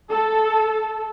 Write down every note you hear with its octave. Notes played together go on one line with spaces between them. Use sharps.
A4